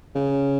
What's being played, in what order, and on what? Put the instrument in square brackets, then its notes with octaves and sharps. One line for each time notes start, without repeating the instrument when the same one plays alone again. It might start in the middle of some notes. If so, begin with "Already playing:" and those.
[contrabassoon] C#3